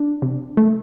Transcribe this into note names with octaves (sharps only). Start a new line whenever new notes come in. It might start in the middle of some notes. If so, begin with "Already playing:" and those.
Already playing: D4
C3
A3